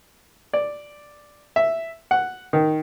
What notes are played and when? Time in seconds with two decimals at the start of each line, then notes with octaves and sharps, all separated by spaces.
0.53 D5
1.56 E5
2.11 F#5
2.53 D#3